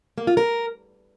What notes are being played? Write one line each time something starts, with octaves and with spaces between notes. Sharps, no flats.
A#3
F4
A#4